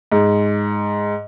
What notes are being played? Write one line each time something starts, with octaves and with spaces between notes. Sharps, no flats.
G#2